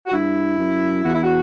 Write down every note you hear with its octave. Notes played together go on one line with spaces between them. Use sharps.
F#4
G2 E4
F#2
E2 F#4
E4
F#4